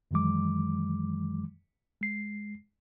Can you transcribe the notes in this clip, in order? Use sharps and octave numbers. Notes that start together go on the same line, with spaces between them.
F#2 D#3 E3 F#3 G#3 D6
G#3 C7